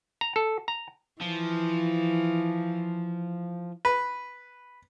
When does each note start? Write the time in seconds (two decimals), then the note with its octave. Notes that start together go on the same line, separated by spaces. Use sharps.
0.21 A#5
0.36 A4
0.68 A#5
1.21 E3 F3
3.85 B4